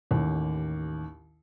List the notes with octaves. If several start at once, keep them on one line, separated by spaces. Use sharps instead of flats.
A1 D#2